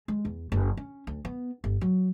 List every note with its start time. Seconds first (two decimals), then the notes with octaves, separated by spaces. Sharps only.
0.08 G#3
0.25 E2
0.52 F#1
0.77 C#4
1.07 D2
1.25 B3
1.64 G1
1.81 F#3